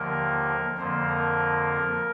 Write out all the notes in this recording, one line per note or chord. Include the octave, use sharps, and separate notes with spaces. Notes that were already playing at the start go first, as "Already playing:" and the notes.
Already playing: D#2 D3 F3 A#3 A#4
F2 D3 F3 A#3 C5
A#4